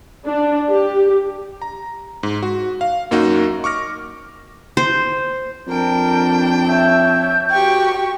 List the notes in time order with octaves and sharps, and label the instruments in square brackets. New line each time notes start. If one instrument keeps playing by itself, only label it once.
[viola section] D4
G4
[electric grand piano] A#5
G#2
F#4
F5
F#2 A#3 D#4 F#4
C#6 D6 F6 A#6
[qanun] C5
[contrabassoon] F2 [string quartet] D4 G5 [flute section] A#4
[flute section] C#5 G6 [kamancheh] E5
[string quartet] F#4 G4 C#6 [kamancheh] G5